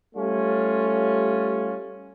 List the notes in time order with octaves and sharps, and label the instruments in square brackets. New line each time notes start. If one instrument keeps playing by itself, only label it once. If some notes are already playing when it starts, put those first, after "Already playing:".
[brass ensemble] G3 A3 C#4 F4